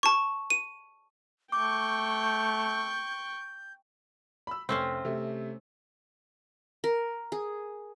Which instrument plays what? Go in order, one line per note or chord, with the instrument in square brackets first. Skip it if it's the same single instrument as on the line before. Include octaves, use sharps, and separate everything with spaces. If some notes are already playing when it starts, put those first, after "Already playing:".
[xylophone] A5 C#6
D#7
[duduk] A3 [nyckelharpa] G5 C#6 [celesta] D6 [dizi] G6
[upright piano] B5 E6
[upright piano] F1 [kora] C4 C#4 C5
[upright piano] C3 A3
[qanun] A#4
G#4